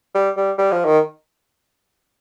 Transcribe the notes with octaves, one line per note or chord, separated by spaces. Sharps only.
G3
G3
G3
F3
D#3